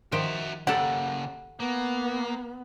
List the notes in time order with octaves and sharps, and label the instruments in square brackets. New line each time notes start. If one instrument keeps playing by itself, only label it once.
[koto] D#3 F3 G5 [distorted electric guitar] F#4 E5
[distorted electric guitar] C#3 A#3 [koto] G4 A4 [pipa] F#5
[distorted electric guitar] A#3 [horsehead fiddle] B3